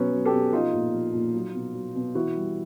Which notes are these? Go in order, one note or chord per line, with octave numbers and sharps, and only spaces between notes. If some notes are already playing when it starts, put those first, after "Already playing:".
Already playing: B2 F#3 B3 C#4
F#3
G4 A4
B2
F3 D#4 F4
A#2
F3
A#2
F#3
B2
F#3
B2
E3 E4 F#4
G3